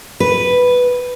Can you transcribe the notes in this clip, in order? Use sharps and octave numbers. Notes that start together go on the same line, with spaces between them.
B4